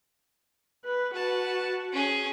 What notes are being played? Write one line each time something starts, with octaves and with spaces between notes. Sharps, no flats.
B4
F#4 B4 A5
C#4 G#4